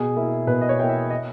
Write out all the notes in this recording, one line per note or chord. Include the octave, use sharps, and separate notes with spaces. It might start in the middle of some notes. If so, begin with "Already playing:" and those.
Already playing: B2 G#4
A#3 E4
B2 B4
D#5
C#5
A#3 E4 G5
E5
D#5